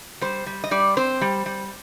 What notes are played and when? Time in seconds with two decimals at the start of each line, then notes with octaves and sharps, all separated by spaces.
0.21 G3 C5
0.46 G3
0.64 D#5
0.71 G3 D5
0.97 C4 C5
1.21 G3
1.46 G3